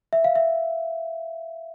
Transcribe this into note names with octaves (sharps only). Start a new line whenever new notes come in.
E5
F5
E5